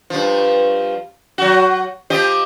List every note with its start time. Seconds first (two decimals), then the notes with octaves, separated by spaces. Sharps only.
0.10 G2 F3
1.38 F#3 F#4
2.10 F3 G4 D#5